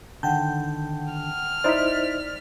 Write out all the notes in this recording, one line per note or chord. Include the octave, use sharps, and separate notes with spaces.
D3 D#3 F#5 G5 A5 G6
F6
D#4 E4 C5 D5 A6 B6